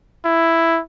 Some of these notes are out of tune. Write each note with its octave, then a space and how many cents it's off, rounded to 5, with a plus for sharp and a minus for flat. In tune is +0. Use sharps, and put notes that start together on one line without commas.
E4 +5